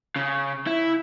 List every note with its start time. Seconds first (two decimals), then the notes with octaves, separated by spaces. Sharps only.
0.16 C#3
0.67 E4